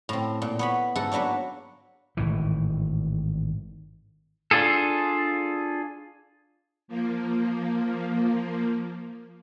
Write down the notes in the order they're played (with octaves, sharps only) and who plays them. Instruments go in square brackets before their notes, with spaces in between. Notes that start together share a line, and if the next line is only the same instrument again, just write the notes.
[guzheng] A2 C4
A#2
B3 C#5 B5
G#2 E4 A4 F#5
F#3 A#3 D4 B4 C#5
[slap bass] G#1 A2 E3
[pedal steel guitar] D4 F4 G#4 A4
[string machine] F3 A#3